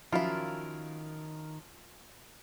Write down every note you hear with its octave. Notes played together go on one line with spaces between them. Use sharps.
D#3 F3 F#3 C#4 E4 F4 A#4